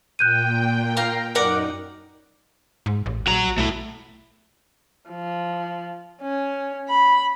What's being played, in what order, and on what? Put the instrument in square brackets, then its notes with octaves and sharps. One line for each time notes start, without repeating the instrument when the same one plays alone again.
[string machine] A#2 G5 [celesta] F#6 G6 D#7
[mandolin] A#4 F5
[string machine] F#2 D#4 [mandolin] A#4 D5 F#5
[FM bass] G#2
A1
[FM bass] A#1 [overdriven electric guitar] F#4 A#5
[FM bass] B1 [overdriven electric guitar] A3 E4
[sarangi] F3
C#4
B5